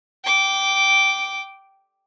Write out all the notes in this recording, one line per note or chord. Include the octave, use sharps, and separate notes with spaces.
G5 D6